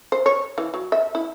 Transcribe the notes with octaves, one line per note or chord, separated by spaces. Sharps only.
C5
C#5
E3
F#3
E5
E4